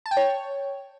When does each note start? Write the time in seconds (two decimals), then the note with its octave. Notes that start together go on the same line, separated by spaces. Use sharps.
0.06 A5
0.11 G5
0.17 C#5